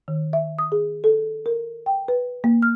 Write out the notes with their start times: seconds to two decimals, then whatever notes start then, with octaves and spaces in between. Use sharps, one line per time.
0.08 D#3
0.33 E5
0.59 D#6
0.72 G#4
1.04 A4
1.46 A#4
1.86 G5
2.08 B4
2.44 A#3
2.62 F6